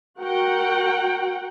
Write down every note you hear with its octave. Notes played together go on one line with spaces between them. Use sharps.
F#4 A#4 F#5 G5